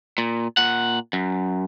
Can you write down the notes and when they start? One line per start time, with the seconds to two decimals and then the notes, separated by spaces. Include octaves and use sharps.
0.18 A#2
0.57 A#2 F#5
1.13 F#2